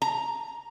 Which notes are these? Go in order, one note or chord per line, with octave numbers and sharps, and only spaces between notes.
A#5